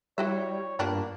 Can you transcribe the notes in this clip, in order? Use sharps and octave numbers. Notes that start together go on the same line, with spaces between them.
G3 E4 F#4 C#5 E5
G2 A#3 B3 D4 F4